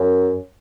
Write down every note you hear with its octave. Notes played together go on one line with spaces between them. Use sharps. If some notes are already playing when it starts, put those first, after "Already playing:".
Already playing: F#2